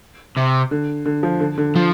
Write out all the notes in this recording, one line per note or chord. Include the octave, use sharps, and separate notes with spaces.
C3
D3
D3
F3
D3
D3
F3